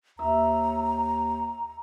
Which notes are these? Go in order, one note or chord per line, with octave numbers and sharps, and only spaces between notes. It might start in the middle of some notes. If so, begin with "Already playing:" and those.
D#2 E5 A#5